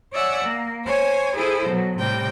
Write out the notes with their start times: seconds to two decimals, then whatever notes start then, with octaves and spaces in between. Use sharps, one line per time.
0.12 C#5 D5 E5 F#5 G#5
0.44 A#3
0.83 C5 C#5 G#5
1.35 E4 G#4 A4 C5
1.67 B2 F#3
1.98 A2 C3 G3 G5